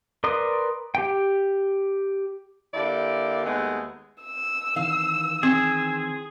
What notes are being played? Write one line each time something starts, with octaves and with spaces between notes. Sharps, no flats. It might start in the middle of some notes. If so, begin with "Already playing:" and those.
A#4 B4 D5 C6 D#6
G4 G5
D3 A#3 E4 G4 D5
D#2 G#3 A3 B3
E6
D#3 E3 F5
C4 G#4